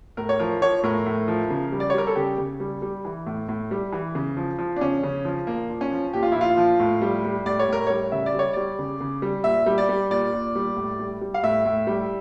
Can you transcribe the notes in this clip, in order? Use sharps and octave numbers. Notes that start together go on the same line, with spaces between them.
A2 A#4
C#5
F3 A#4
F3 C#5
A2 A#4
A2
F3
C#3
G3
D5
C#5
G3 A#4
A4
C#3 G4
C#3
G3
G3
E3
A2
A2
G3
E3
C#3
F3
F3
D4
C#3 C#4
C#3
F3
A#2 A#3
F3
C#4
F3
A#2 G4
F4
A#2 E4
F4
F3
A2
G3
G3
A2 D5
C#5
A2 A#4
G3 C#5
C#3 E5
D5
G3
C#5
G3 D5
C#3
C#3
G3
A#2 E5
G3
D5
G3
A#2 D5
A#2
G3
A2
G3
G3
F5
A2 E5
A2
G3